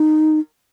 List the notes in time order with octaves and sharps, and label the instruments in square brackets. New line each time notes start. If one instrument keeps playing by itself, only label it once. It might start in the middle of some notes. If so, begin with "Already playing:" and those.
Already playing: [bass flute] D#4